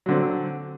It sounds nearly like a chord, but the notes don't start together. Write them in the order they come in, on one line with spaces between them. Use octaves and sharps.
F#3 D3 C4